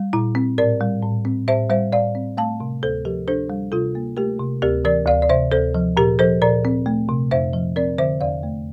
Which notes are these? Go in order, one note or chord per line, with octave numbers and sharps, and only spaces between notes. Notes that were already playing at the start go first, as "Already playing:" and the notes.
Already playing: G3
A#2 E4
C4
A2 A#4 D5
G3
A2
C4
A2 C5 E5
G3 C5 E5
A2 D5 F5
C4
A3 F5 A5
C3
D2 A4 C5
F3 G4 A#4
D4 A4 C5
G3
C3 F4 A4
A#3
A3 G4 A#4
C3
D2 G4 A#4
E3 A#4 D5
D2 D5 F5
D5
C3 C5 E5
D2 A4 C5
F3
A#2 G4 A#4
F3 A4 C5
A#2 A#4 D5
C4
A3
C3
F2 C5 E5
F3
C4 A#4 D5
D3 C5 E5
E2 D5 F5
A3